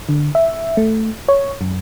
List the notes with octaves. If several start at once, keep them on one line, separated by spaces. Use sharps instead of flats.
D3
E5
A3
C#5
F#2